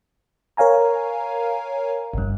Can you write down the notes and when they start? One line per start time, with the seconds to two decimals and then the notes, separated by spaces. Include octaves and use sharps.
0.57 A#4 C#5 F5 G#5 A#5
2.14 G1 G2